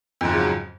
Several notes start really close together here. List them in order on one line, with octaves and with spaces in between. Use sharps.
F2 G#2 F3 C#3 F#3